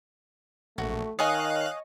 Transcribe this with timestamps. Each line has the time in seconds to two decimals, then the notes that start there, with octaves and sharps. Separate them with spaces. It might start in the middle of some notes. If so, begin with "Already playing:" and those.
0.78 A#1 A3 F#4
1.19 D#3 C#5 D#5 F5 G#5 D#6 F#6